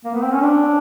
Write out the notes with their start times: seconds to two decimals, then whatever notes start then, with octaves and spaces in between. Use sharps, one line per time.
0.04 A#3
0.14 B3
0.23 C4
0.33 C#4
0.42 D4